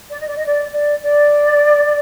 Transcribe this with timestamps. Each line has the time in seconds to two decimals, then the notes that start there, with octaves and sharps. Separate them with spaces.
0.10 D5
0.19 D#5
0.28 D5
0.37 D#5
0.46 D5
0.73 D5
1.04 D5